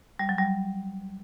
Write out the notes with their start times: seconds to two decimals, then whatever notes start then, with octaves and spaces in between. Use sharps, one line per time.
0.19 G3
0.29 F#3
0.38 G3